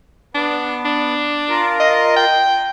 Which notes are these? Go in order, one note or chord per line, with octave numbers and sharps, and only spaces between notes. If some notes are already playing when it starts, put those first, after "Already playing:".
B3 D4
D4
F4 A#4
D#5
G5